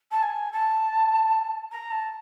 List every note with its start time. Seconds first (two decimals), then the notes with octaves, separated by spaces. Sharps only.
0.11 A5
0.23 G#5
0.52 A5
1.72 A#5
1.91 A5